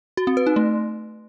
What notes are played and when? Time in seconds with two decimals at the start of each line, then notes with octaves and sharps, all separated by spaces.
0.17 F#4
0.27 C4
0.37 B4
0.47 D#4
0.56 A3